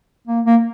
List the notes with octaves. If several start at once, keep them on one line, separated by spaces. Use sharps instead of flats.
A#3
A#3